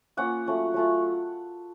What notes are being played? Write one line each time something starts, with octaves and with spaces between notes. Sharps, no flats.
A#3 C#4 F4 F#5
F#3 A3 C#4 F4
F#3 A3 C#4 F4